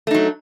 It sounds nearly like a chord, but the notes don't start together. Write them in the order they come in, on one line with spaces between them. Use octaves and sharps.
A3 D#4 F#3